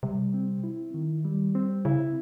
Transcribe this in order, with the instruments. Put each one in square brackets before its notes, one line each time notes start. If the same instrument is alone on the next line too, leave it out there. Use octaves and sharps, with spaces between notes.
[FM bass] C3 [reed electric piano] G3
[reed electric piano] C4
E4
D#3
G3
C4
[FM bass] C#3 [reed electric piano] E4